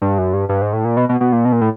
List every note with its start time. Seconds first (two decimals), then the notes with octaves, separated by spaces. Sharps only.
0.02 G2
0.18 F#2
0.33 G2
0.49 G2
0.62 G#2
0.73 A2
0.85 A#2
0.97 B2
1.09 B2
1.20 B2
1.32 A#2
1.45 B2
1.52 A#2
1.61 A2